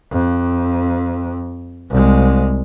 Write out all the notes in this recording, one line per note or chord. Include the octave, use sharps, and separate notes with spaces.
F2
C2 G#3